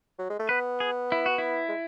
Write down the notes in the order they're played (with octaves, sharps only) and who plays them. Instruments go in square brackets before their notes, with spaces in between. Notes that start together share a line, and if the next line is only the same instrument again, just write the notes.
[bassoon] F#3
G#3
A3
[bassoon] B3 [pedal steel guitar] B4
[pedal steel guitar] G#4
E4
F#4
E4
[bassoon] G#3